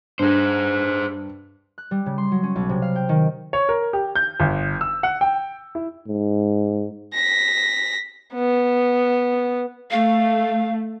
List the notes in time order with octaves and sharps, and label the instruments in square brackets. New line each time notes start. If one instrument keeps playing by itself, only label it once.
[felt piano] G2 [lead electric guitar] G#4 C5
[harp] F#6
G3
C#3
C6
F#3
C#4
B1
C3
F5
G5
D#3
[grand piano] C#5
A#4
G4
G6
G1
E6
F#5
G5
E4
[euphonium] G#2
[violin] A#6 B6
B3
[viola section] A3 [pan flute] F5